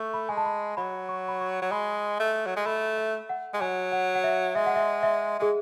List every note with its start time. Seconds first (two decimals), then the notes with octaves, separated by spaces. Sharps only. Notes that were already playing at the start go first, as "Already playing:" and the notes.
Already playing: A3 C#6
0.14 B5
0.29 G#3 G#5
0.37 A5
0.45 B5
0.77 F#3 B5
1.09 C#6
1.28 B5
1.41 C#6
1.62 F#3
1.71 G#3 B5
2.20 A3
2.46 F#3
2.56 G#3
2.66 A3 B5
2.98 E5
3.29 F#5
3.54 G#3
3.61 F#3 G#5
3.92 F#5
4.15 F#5
4.24 E5
4.55 G#3 E5
4.66 F#5
4.76 E5
5.03 E5
5.39 G#3 G#4